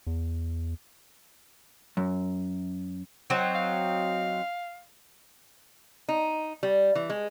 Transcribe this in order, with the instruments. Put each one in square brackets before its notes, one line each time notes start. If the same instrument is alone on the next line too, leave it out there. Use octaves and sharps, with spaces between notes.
[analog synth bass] E2
[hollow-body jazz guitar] F#2
[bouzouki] F#3 C4 D#4
[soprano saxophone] F5
[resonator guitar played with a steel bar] D#4
G3
E3
G#3